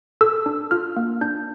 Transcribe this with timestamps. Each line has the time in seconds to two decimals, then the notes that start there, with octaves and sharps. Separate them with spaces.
0.21 A4 E6
0.46 D4
0.71 F4 F6
0.97 A#3
1.21 D4 G6